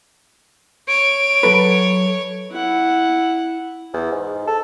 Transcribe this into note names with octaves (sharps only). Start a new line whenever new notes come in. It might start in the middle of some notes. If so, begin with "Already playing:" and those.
C#5 D7
F#3 A4 B4
E4 F#5
E2
G#2
A4